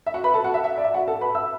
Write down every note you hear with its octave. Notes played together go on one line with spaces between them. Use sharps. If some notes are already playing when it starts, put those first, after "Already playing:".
E5
F#4 F#5
B4 B5
A4 A5
F#4 F#5
E5
E5
D5
E5
F#4 F#5
A4 A5
B4 B5
E5 E6